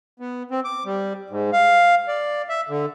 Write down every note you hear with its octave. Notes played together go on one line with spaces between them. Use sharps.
B3
C4
D6
G3
G#2
F5
D5
E5
D3